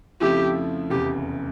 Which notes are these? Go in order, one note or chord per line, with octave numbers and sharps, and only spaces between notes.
F2 C#3 F3 A3 E4 G4
F1 E2 C#3 G4